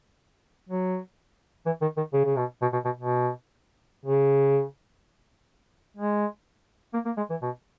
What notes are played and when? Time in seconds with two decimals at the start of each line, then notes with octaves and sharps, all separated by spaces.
0.69 F#3
1.66 E3
1.82 D#3
1.97 D#3
2.13 C#3
2.25 C#3
2.37 B2
2.62 B2
2.73 B2
2.85 B2
2.97 B2
4.05 C#3
5.97 G#3
6.93 A#3
7.06 A#3
7.17 G#3
7.30 E3
7.42 B2